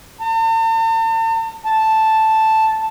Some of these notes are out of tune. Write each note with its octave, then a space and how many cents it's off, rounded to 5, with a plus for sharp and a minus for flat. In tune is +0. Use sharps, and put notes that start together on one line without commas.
A5 +45
A5 +0